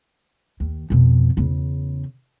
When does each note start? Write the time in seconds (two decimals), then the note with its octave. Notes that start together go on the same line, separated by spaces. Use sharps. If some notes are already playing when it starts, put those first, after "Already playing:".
0.60 D#2
0.90 F2 B2
1.37 E2 C#3